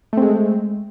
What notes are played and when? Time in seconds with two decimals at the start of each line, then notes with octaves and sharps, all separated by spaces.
0.13 A3
0.17 C4
0.22 G#3